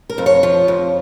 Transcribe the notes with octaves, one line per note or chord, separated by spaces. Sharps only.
A#4
F2
C#5
F3
F2